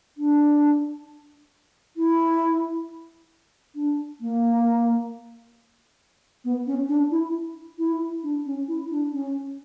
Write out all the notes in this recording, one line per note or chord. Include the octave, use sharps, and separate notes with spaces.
D4
E4
D4
A#3
B3
C#4
D4
E4
E4
D4
C#4
E4
D4
C#4